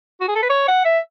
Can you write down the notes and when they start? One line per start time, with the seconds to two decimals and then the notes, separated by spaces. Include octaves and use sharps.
0.21 F#4
0.28 G#4
0.36 A4
0.43 B4
0.50 C#5
0.68 F#5
0.85 E5